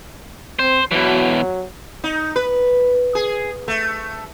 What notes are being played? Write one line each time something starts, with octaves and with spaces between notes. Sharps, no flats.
C4 C5
B2 E3 F#3
D#4
B4
G#4
A3